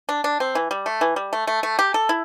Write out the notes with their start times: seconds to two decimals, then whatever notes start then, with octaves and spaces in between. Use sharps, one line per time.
0.09 D4
0.24 D4
0.40 C4
0.55 E3
0.71 G3
0.86 A3
1.01 E3
1.16 G3
1.33 A3
1.47 A3
1.63 A3
1.79 G4
1.94 A4
2.09 E4